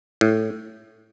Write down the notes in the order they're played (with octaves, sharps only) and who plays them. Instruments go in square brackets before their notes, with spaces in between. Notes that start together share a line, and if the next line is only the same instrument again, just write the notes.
[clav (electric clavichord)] A2